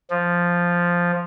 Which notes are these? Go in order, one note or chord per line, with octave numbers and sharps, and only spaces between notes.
F3